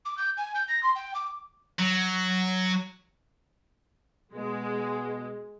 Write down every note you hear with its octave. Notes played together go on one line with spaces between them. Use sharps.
D6
G6
G#5
G6
A#6
C6
G5
D6
F#3
B2 G#3